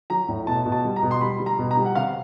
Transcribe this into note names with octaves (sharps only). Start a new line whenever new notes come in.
F#3 A#5
A2
B2 A5
B2
A5
G3
A#5
B2
C6
G3 B5
G3
A#5
B2
A#5
G3
F#5
C3 F5